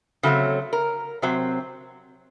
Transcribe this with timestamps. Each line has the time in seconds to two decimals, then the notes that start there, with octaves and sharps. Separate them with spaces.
0.23 C#3 F#3 A3 C4
0.73 A#4
1.22 C3 F#3 C4